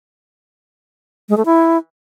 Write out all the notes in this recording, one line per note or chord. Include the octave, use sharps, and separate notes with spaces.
G#3
A3
E4